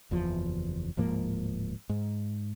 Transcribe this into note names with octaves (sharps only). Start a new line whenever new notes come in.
F#1 E2 F3
D1 G#2 F3 A#3
G#2